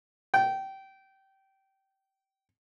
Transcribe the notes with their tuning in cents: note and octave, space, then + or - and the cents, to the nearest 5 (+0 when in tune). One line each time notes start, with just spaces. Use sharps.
G5 -20